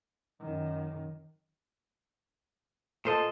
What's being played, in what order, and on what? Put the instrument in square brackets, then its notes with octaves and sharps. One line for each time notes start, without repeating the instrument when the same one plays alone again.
[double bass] F#2 D#3
[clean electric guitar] A#2 C5 D#5 [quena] A4